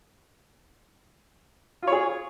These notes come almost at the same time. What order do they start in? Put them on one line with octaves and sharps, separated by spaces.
F4 C#5 G#4